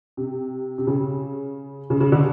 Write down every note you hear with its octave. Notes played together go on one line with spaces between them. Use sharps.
C3
C3
C#3
C#3
C#3
D3